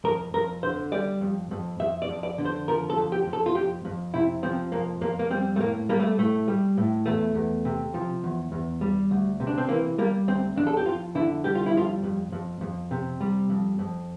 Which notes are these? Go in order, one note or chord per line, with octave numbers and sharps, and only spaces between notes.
F2 A#4
F2 A#4
D3 C5
G3 D5
F2
F2
F2 E5
D5
F2
D5
D3
C5
F3 A#4
A4
F2
G4
F2
A4
F4
F2 G4
F2
C3 E4
F3 C4
F2 A#3
F2 A#3
A#3
G3 C4
A3
A2 A#3
G3 A#3
A3
A2 A3
G3
A2
E2 A3
E2
C3
F3
E2
E2
G3
D2
C3
D4
C4
E3 A#3
G3 A#3
D2 C4
F2 D4
A4
G4
F2 F4
D3 E4
G3 G4
F4
E4
F2 F4
F2
F2
F2
C3
G3
F2
F2